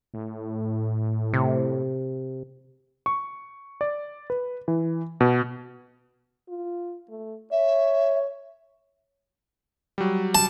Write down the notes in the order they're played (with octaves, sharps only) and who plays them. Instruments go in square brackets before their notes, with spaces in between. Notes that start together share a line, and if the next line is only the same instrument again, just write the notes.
[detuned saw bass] A2
[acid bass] C3
[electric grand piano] C#6
D5
B4
E3
B2
[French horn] F4
A3
[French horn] C#5 [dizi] E5
[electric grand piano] F#3 G3
[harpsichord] A5